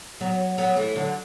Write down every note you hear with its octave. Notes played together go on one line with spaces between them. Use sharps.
F#3 B3
F#3 B3
E3 A3
D3 F#3